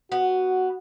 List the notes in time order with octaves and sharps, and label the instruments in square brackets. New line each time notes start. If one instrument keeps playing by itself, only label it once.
[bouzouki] B3 [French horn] F#4